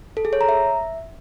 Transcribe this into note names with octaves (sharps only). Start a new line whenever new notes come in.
A4
G#4
C#5
A#5
E5